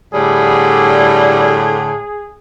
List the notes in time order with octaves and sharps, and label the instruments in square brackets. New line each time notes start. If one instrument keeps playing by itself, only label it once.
[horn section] A2 D3 [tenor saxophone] G3 [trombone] G#4